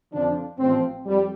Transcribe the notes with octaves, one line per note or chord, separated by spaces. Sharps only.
F2 D3 F3 D4
A1 A2 F3 C4
F2 G3